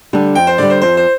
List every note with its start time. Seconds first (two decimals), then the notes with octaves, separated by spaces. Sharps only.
0.13 D3 G3 D4
0.35 F2 G5
0.47 C5
0.58 D3 G3 D5
0.70 C5
0.82 F2 C5
0.97 C5